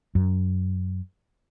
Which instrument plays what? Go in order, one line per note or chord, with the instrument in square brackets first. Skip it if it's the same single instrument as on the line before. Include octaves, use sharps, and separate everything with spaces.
[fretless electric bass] F#2